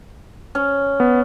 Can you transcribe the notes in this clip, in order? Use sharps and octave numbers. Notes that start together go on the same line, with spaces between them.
C#4
B3